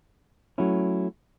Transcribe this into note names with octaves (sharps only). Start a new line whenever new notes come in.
F#3 A3 C#4 E4